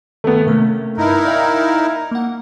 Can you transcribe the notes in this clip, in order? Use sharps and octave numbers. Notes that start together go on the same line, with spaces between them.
D#3 A3 B3
C3 A3 A#3 C#4
G2 D3 D#4 E4 A#4
D5 F5 G5
A#3 F#5